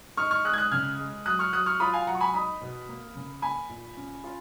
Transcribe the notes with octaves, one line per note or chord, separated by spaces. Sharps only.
D#4 C#6 F6
C#6 F6
G#3 D#6 F#6
G#6
D#6 F#6
C#3 F6 G#6
G#3
F#3 D#6 F#6
C#6 F6
F#3 D#6 F#6
C#6 F6
F4 B5 D#6
F5 G#5
F#3 F#5 A#5
C#6
G#5 B5
D#4 B5 D#6
B2
A#3
C#3
A#3 G#5 B5
A#2
C#4
F4